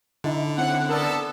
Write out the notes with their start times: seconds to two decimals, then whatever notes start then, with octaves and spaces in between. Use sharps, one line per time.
0.24 D3 D#4 E4 A5
0.58 C4 C#4 E4 F#5
0.89 B3 A4 A#4 D5